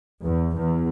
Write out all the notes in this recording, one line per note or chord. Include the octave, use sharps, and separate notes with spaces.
E2
E2